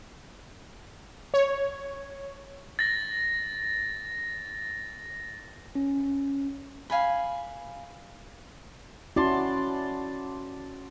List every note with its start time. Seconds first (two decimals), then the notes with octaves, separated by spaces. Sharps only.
1.34 C#5
2.79 A6 A#6
5.75 C#4
6.90 F5 G#5 B5
9.16 C#4 E4 F#4 D5 A5 C6